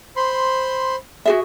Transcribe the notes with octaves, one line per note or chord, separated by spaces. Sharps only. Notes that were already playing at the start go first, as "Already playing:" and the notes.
C5 B5 C6
F#4 G#4 E5